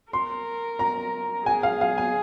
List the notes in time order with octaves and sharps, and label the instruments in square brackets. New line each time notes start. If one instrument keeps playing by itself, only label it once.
[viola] A#4 [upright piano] C6
[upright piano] A#5
[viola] G#4 [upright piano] G#5
[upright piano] F5
F5
G#5